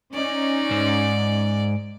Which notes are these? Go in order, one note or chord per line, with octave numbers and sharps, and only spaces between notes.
C#4 D#4 D5
G#2